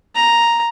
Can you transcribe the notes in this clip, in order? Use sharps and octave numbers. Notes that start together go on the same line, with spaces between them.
A#5